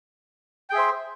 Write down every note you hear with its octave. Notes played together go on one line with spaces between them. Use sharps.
G#4 C5 E5 G5